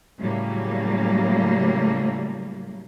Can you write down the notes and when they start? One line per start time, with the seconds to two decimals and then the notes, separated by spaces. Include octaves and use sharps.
0.20 A2 C#3 F#3 G3 A3 A#3